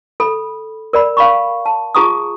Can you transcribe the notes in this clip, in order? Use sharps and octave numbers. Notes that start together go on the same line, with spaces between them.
A4 B5
A#4 D5 B5
F5 B5 C#6
A5
F4 G#4 A#5 C#6 D#6